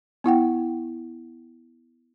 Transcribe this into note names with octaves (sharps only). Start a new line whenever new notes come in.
B3 E4 F#5 G5